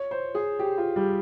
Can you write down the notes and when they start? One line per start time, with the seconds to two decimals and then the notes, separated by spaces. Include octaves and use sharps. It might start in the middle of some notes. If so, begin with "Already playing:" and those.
Already playing: C#5
0.11 C5
0.35 G#4
0.59 G4
0.78 F4
0.96 G3